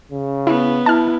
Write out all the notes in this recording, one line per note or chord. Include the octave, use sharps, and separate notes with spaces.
C#3
B3 E4
E4 A5 F6